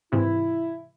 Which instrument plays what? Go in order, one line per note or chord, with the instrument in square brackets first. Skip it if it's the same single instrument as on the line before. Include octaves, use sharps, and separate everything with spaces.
[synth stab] G#2 C3 E3 [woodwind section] E4